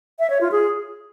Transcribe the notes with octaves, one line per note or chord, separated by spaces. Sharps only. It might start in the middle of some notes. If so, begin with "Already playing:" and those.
E5
C#5
F4
G#4